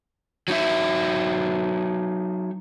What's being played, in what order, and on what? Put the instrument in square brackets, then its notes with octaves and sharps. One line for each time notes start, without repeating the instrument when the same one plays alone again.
[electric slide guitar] F#3 D#4 E5